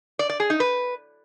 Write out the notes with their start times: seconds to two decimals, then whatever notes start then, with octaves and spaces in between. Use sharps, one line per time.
0.19 D5
0.30 D5
0.40 G#4
0.50 D#4
0.60 B4